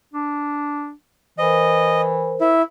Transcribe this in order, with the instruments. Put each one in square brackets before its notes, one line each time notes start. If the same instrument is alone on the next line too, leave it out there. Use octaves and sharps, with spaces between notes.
[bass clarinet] D4
[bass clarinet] E3 [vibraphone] A#4 C5 [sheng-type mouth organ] D#5
[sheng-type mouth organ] E4